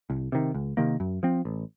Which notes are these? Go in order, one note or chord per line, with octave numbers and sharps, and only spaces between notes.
C2
C3 D#3
C#2
C3 D#3 A#3
F#2
F3 C4
A1